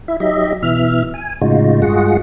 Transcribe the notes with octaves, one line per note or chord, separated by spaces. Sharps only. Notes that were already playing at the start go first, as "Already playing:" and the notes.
E4 E5
F#3 D#4 G4 D#5 E5
B2 E3 E5 F6
G#5
A2 C#3 G#3 D#4 F4 F#4
G2 G#3 F4 F#4 G#4 F#5